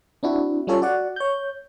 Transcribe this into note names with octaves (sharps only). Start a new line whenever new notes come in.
C4 D4 E4 F#4
G3 C#4 F4 A4 C#5
F#4 D5 F#5
C#5 G6